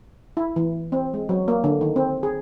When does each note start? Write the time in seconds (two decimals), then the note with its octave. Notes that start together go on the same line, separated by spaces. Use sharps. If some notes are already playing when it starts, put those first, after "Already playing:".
0.37 E4
0.56 E3
0.92 C4
1.14 G#3
1.29 F#3
1.48 A#3
1.64 D3
1.81 D#3
1.96 C4
2.23 G#4